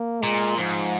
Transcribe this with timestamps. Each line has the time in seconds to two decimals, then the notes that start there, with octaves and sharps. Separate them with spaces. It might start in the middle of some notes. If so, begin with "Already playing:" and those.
Already playing: A#3
0.23 A#2 G#3
0.57 G#2 F3